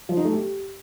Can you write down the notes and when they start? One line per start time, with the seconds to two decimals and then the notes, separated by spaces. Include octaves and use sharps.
0.09 F3
0.17 D#4
0.25 A3
0.33 G4